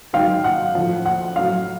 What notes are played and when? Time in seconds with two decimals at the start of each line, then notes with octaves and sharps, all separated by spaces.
0.13 G#2 D#3 F#3 F5 G5
0.44 F#5
0.75 A2 F3
1.06 F#5
1.36 A2 F#3 F5